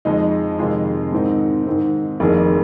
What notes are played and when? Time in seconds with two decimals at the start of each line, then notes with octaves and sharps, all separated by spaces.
0.05 F2 F3 G#3 D#4
0.59 F2 C3 D#3 G#3 F4
1.12 G#2 D#3 C4 D#4
1.67 G#2 D#3 C4
2.20 F1 F2 D#3 A#3 G#4